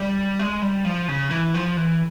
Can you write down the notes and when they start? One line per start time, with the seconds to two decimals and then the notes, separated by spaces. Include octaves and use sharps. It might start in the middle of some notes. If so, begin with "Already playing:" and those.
Already playing: G3
0.39 G#3
0.62 G3
0.85 F3
1.08 C#3
1.31 E3
1.54 F3
1.77 E3